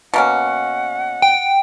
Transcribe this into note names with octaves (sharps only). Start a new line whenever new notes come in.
B2 A#3 C#4 F#5
G5